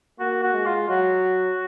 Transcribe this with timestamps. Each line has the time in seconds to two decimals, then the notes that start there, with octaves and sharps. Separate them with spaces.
0.19 A#3 F#4
0.43 F#4
0.54 G#3
0.66 F4
0.89 F#3 F#4